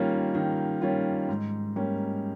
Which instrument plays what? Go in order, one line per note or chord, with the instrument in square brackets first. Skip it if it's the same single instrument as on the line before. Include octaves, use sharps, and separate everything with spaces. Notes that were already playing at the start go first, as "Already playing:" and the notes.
Already playing: [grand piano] D#3 G3 A#3 C#4 F4
D#3
G3 A#3 C#4 F4
G#2
G3 A#3 C#4